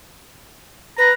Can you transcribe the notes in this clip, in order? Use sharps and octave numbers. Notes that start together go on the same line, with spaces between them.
B4 A#5